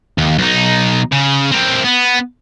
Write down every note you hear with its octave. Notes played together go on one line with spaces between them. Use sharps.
D#2
B1 D#4
C#3
C4 A#4
B3